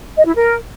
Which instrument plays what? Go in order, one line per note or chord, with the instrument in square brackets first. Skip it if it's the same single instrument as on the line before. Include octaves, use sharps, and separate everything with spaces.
[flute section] D#5
E4
A#4